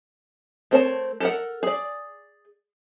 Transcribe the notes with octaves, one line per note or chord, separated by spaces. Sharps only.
A3 C4 A#4 C#5 A5
A4 A#4 F#5
G#4 D5